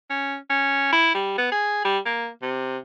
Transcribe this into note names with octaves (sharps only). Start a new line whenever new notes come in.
C#4
C#4
E4
G3
B3
G#4
G3
A#3
C3